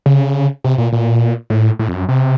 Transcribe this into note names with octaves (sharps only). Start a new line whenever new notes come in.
C#3
C3
A#2
A#2
A2
A2
F2
F#2
C3